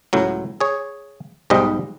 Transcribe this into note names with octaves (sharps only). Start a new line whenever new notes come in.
C#2 A2 F#3
G#4 C#5
B1 G#2 G3 C5 D#5